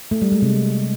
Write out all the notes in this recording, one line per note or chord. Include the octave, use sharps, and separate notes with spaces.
A3
G3
G#3
C3